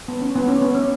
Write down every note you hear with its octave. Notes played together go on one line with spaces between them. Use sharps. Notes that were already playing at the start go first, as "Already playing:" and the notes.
B3
C#4
B3
C#4
B3
C#4